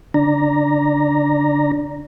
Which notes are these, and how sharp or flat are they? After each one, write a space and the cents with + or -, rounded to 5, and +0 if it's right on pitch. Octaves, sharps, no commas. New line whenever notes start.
D3 -40 D4 +0 A#5 +0